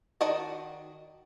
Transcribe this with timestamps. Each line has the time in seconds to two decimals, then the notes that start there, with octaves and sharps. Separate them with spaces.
0.21 D#3 F#4 D5 D#5 A5